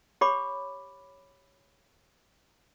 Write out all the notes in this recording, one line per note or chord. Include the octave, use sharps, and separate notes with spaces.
G4 C#5 B5 D6